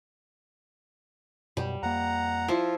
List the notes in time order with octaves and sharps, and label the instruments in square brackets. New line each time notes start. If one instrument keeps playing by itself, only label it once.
[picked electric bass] F#2 B2 [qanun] G3
[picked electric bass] F2 A#3 [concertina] F#5 A#5
[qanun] F3 E4 [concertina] F4